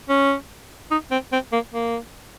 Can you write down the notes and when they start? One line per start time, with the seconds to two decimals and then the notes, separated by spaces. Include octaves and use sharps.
0.09 C#4
0.91 D#4
1.11 C4
1.32 C4
1.52 A#3
1.73 A#3